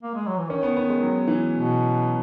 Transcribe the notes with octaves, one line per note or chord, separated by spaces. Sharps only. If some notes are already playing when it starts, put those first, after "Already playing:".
A#3
G#3
F#3
E3
D#3 C#4
B3
B3
G#3
F#3
E3
B2